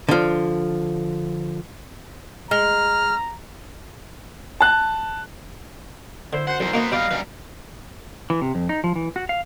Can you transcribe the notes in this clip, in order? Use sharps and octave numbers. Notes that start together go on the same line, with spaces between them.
D3 F3
G#3 A#5 F6
A5 F#6
D3 E4 C5
F#2 C5 F#5
B1 E2 D#3
F#3 A#3 B3 D#4 A#5
B2 G3 D#4 D5 D#5 F5
F#2 G3 B4
E3
C3
F2
D#4
F3
E3
F#4
F5